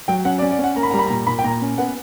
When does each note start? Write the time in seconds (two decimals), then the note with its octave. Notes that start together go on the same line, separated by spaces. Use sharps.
0.08 F#3 G5
0.25 C#4 F#5
0.38 D5
0.42 C#4
0.51 D5
0.59 C#4 F#5
0.76 A#3 A#5
0.83 B5
0.91 G3 A#5
0.99 B5
1.06 A#5
1.10 A#2
1.27 A#2 B5
1.39 G5
1.44 A#2 A#5
1.62 C#4
1.78 B3 F#5